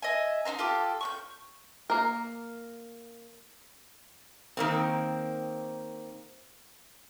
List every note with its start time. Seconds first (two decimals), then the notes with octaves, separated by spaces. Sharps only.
0.03 D#5 E5 G#5
0.45 D#4 E4 C5 A#5
0.59 F4 G4 A4 D6
1.01 C#6 F#6 G6
1.90 A#3 A#4
4.57 D#3 A#3 C4